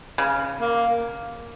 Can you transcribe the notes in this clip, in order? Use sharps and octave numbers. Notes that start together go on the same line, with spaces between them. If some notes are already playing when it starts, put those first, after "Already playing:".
C#3
A#3